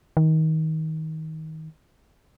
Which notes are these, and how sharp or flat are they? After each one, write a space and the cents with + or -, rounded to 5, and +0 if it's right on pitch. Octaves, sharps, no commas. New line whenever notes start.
D#3 +25